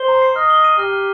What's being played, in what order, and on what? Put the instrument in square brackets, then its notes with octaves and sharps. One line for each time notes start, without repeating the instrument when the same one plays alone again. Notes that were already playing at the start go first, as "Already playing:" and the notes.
Already playing: [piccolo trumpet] C5 [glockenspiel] G7
[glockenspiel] A#5
C7
[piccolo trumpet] D#5 [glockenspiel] F6
[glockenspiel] G7
D#7
[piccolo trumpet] G4 [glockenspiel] F6
[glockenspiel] F6